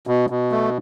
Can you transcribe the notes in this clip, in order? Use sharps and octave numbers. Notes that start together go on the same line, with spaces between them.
B2
B2
A3